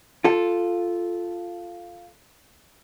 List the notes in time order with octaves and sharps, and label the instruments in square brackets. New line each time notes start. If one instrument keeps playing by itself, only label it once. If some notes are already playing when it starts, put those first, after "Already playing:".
[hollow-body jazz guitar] F4 A4